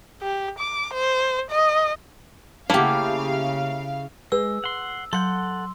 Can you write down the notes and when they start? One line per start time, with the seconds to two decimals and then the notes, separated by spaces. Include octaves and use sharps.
0.22 G4
0.59 D6
0.94 C5
1.51 D#5
2.70 C#3 A3 A#3 E4 G4 F5
4.32 G#3 G#4 B4 E6
4.64 F#5 C6
5.13 F#3 A4 F#5 C6 G6